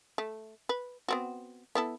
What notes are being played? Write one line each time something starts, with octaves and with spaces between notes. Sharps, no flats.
A3
B4
B3 C4 F#4
B3 E4 A4